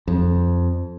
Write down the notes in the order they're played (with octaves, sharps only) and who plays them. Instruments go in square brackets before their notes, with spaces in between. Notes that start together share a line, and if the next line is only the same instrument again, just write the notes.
[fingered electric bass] F2